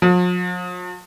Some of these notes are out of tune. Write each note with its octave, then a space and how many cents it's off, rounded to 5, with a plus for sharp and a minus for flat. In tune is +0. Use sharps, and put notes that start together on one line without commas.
F3 +45